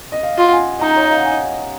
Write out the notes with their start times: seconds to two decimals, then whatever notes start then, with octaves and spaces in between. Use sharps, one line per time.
0.12 D#5
0.23 F5
0.38 F4
0.47 F#5
0.52 G#5
0.81 D#4 A#5
0.96 C#5
1.03 D#5
1.11 F5
1.18 F#5
1.25 G#5